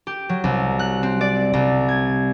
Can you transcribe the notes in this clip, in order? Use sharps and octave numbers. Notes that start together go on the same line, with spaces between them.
G4
F#3
C2
F#6
C4
D5
C2
G#6